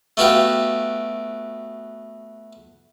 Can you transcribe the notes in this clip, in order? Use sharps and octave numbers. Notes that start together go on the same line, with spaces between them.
A3 B3 F#4 G4 F5 G5